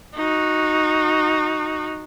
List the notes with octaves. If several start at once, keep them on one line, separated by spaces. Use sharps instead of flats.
D#4 F#4